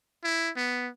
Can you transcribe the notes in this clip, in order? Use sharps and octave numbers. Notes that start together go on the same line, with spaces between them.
E4
B3